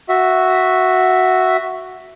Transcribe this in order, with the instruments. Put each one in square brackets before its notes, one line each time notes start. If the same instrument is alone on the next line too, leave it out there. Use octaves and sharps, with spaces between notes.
[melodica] F#4 E5